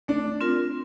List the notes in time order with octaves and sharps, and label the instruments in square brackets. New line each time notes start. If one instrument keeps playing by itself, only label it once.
[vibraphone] A3 [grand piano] D4
[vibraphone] C4 F4 A#4